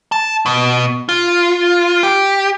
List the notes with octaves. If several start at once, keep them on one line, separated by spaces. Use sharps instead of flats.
A5
B2
F4
G4